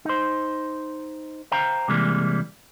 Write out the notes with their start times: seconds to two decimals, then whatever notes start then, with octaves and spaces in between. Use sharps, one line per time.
0.05 D#4 C5
1.52 C5 F5 G5 A#5
1.88 C3 E3 G3 G#3 A#3